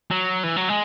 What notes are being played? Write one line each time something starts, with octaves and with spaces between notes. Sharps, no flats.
F#3
E3
F#3
G#3